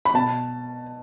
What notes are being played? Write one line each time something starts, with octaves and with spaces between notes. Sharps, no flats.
B5
B2 A5